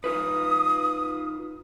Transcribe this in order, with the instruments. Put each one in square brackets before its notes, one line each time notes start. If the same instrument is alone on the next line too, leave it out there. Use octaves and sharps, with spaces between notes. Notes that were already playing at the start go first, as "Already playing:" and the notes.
[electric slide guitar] D#4 F4 B4 [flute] D#6